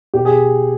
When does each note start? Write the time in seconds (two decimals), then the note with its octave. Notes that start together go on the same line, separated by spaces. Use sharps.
0.14 B2 G4
0.25 G#4